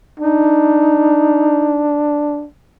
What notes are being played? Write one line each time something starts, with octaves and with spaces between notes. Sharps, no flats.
D4 D#4